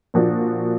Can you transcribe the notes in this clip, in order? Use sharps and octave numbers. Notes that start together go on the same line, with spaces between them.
A#2 F3 A#3 D4 F#4